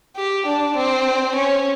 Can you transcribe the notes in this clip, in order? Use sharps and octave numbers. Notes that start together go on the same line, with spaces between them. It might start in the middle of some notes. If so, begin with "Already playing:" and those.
G4
D4
C4
C#4